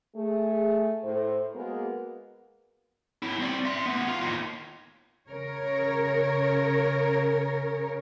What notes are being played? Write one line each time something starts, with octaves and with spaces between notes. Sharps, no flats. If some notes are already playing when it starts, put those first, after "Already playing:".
A3 G#4
A2 C5
G#3 A#3 B3 F#4 G#4 A#4
F#3 E4
C4 D5
E5 C6
A3 B3
F4
D#2 A2
C#3 A#4 C#5